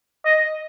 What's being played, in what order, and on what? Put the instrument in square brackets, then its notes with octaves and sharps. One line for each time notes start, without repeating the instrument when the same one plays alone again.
[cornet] D#5